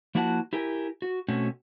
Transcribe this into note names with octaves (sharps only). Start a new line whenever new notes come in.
F3 A#3 E4 F#4 F#5 A5
E4 G4 A#4 G#5
F#4
B2 A3 C4 C#4 F#4